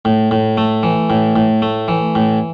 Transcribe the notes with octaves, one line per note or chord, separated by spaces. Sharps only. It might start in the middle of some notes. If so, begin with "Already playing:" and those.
A2
A2
A3
E3
A2
A2
A3
E3
A2